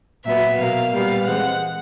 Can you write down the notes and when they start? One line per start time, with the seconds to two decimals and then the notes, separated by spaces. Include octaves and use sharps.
0.24 A#2 F#3 B3 E5
0.58 B2 F#3 A#3 F5
0.92 A#2 G3 B3 F5
1.25 E3 G#3 C4 F#5